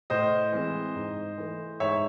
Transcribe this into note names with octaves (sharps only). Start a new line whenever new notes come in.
A2 C5 D#5
E3 G#3 C4
G#2
E3 A3
G#2 C#5 E5